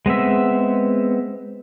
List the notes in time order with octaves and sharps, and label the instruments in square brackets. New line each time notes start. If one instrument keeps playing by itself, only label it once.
[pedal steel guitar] G#3 B3 C4 E5